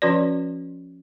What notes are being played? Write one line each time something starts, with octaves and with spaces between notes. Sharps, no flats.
F3 C#4 F#4 B4 D5